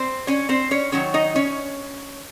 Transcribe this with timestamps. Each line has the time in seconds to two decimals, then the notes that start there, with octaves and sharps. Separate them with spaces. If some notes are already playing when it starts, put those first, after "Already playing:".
Already playing: C4 C5
0.27 C#4 C#5
0.49 C4 C5
0.71 C#4 C#5
0.92 D#3 F#3 C#4 C#5
1.14 D#4 D#5
1.35 C#4 C#5